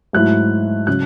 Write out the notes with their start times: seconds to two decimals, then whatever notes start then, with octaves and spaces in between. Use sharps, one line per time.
0.13 G#2 F#3 A3 E4 F#6
0.87 C#3 F#3 F#6